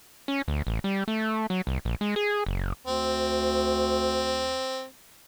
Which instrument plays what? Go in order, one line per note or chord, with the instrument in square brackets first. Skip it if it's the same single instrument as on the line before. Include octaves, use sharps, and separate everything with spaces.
[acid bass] C#4
D2
A1
G3
A3
F#3
C2
A#1
G#3
G#4
F#1
[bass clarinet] D2 [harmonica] C4